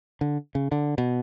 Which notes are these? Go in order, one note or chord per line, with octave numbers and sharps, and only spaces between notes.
D3
C#3
D3
B2